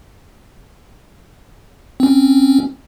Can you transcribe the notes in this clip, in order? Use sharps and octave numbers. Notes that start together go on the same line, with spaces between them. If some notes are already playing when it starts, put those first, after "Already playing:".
C4 C#4